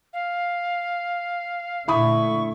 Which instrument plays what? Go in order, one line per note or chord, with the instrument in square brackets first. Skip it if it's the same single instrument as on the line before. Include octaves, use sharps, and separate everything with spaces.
[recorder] F5
[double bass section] A#2 D3 A3 [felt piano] E4 B5 D#6 [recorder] C#6